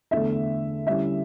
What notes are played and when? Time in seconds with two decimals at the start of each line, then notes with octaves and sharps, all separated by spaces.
0.11 E2 D3 A3 E5
0.87 D3 G3 C#4 E4 E5